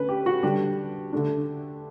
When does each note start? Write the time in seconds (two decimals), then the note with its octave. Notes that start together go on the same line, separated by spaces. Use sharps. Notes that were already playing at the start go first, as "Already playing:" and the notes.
Already playing: D3 A3 C#4 B4
0.09 G4
0.26 F#4
0.43 D3 G3 D4 G4
1.13 D3 A3 D4